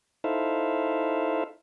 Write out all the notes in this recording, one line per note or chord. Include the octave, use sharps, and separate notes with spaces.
D#4 E4 A4 C5 E5 F5